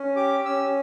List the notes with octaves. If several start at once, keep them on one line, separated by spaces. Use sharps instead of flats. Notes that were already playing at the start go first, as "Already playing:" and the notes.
Already playing: C#4
G4 D6
C#4 E6